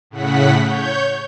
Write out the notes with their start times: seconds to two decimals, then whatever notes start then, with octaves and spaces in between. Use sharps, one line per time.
0.10 A2 C#3 F#5 B6
0.62 C#5 G6